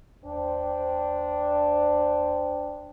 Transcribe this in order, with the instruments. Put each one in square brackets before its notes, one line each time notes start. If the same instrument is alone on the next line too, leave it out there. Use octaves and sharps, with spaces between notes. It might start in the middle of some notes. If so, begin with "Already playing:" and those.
[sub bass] D#2 [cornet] D4 [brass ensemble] C5 G5